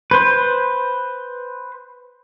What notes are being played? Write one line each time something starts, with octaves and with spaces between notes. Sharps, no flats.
B4 C5